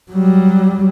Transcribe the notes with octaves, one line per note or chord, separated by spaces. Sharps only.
F#3 G3